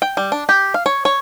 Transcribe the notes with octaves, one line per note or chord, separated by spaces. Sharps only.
G5
G3
D4
G4
F5
C#5
C#5